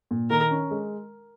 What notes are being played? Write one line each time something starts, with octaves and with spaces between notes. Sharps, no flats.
A#2
D#3 A#4
C#4
G#3